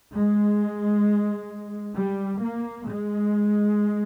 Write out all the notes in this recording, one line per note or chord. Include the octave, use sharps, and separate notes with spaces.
G#3
G3
A#3
G#3